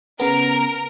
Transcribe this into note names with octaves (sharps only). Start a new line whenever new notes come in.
C#3 B3 A#4